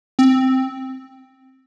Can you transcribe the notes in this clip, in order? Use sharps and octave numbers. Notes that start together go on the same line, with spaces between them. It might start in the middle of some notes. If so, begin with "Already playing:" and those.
C4